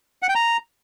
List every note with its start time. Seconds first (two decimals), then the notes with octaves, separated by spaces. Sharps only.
0.22 F#5
0.29 G5
0.35 A#5